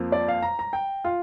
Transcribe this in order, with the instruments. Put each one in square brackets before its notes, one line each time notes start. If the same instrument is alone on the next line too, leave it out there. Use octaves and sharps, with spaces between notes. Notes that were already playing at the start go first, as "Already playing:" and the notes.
Already playing: [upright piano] F2 F3 A#3
D5
F5
A#5
A#5
G5
F4